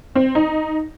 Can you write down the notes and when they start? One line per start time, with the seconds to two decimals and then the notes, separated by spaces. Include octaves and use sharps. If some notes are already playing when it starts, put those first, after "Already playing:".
0.15 C4
0.35 D#4